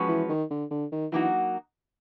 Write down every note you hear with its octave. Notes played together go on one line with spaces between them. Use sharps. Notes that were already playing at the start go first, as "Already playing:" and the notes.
Already playing: F3 G#3 C#4 F#4 B4
E3
D#3
D3
D3
D#3
E3 F#3 A#3 D#4 F#4